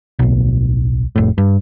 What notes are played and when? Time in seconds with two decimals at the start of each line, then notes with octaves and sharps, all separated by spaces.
0.19 D1 B1
1.16 F1 A2
1.38 G2